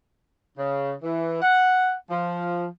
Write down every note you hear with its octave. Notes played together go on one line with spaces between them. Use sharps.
C#3
E3
F#5
F3